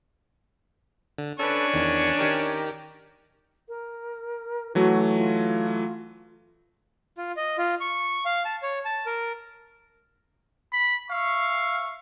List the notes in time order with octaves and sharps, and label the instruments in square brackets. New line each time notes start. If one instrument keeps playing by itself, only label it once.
[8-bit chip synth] D3
[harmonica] C#4 D4 C#6 [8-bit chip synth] A4 B4
[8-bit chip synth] E2 D#3
D#3 G4 A#4
[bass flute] A#4
[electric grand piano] E3 F#3 A3 [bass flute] F#4
[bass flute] F4
[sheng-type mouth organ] F4
D#5
F4
C#6
F5
A5
C#5
A5
A#4
[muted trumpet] B5
[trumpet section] E5 C#6 [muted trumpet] F5